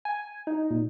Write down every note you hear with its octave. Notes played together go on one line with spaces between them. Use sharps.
G#5
D#4
A#2